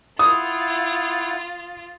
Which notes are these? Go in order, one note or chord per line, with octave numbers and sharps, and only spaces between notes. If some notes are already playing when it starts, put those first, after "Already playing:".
E4 F4 F#5 D#6